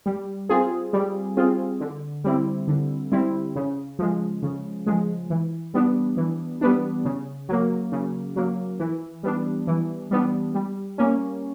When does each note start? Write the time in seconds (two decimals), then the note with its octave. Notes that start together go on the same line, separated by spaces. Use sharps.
0.06 G3
0.49 C4 F4 G#4
0.93 G3
1.37 C4 F4 G#4
1.80 D3
2.24 G3 C4 E4
2.68 D3
3.12 G3 C4 E4
3.56 C#3
3.99 F3 G#3
4.43 C#3
4.87 F3 G#3
5.30 E3
5.74 G3 B3 D4
6.17 E3
6.61 G3 B3 D4
7.05 C#3
7.49 F#3 A#3
7.92 C#3
8.36 F#3 A#3
8.80 E3
9.23 G3 B3 D4
9.67 E3
10.11 G3 B3 D4
10.55 G3
10.98 A#3 C#4